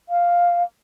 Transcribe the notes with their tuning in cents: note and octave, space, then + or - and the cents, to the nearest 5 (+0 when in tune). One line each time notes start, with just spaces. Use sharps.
F5 +0